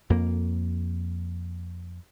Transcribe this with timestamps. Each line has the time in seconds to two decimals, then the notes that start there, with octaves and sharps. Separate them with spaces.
0.10 F2 A#3